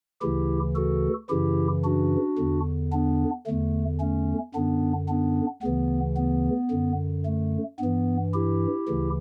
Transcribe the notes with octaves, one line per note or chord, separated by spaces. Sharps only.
D2 C#3 E3 E4 G4
F#4 A4
F#2 C#3 E3 E4 G4
D4 F#4
E2 D3
B3 D4
E2 D3 A3
A3 C#4
F#2 D3 B3 D4
B3 D4
D2 C#3 E3 B3
B3
F#2 D3
A3
G2 E3 B3
E4 G4
D2 C#3 E3